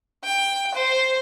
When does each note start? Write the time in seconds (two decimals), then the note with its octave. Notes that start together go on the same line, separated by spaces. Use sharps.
0.24 G5
0.74 C5